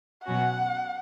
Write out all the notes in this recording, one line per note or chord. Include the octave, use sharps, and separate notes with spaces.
B2 F#3 C#4 F#4 F#5